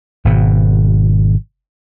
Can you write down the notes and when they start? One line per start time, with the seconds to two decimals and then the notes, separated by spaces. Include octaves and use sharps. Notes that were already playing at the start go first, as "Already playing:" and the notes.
0.25 G#1 B2